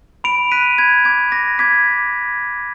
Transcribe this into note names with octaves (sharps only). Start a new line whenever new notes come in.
B5 D7 F7
F#6 B6 D#7
B5 G#6
D6 G#6
D6 A#6
D6 G#6 B6